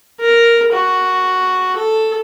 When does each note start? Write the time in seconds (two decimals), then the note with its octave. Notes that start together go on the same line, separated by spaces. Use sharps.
0.21 A#4
0.72 F#4
1.76 A4